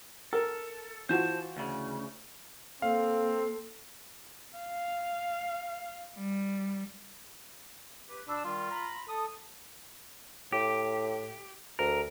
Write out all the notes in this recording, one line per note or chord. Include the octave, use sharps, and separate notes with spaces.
A4 A#4
E3 F4 F#4 C5 A5
D2 C#3
A#3 C4 A4 F5
F5
G3
G4 B4
B2 D4 B5 E6
D#3 G3 F4
A#5 B5
A4 D#6
A2 G4
D2 A#4